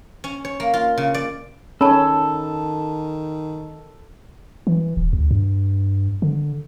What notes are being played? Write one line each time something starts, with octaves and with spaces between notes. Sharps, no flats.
C#4
C#5
A#3
F4
C#3
D5
D#3 C#4 A4 A5 B5
E3
D#1
D2
G2
D3